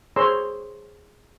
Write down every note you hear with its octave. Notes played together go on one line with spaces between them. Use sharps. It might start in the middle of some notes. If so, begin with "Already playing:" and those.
G#4 C5 C#5 A#5 C6 E6